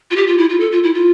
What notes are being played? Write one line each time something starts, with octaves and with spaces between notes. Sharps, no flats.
F4
G4
F4
E4
F4
A4
F4
E4
F4